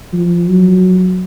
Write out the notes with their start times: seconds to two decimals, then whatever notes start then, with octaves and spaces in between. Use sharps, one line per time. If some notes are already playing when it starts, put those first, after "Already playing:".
0.13 F3
0.48 F#3